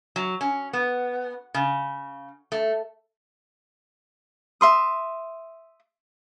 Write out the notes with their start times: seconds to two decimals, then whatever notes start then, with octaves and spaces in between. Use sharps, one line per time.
0.16 F#3
0.41 C#4
0.73 B3
1.54 C#3
2.52 A3
4.61 E5 C6 D#6